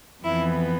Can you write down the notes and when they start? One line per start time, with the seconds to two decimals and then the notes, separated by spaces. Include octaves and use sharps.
0.23 F2 E3 B3 E4